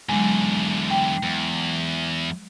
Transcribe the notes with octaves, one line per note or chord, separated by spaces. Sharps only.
E2 D3 F#3 G#3
G5
E2